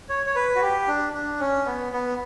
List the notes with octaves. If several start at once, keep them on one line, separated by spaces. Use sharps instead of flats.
C#5
C#5
B4
F#4
G4
D4
D4
C#4
B3
B3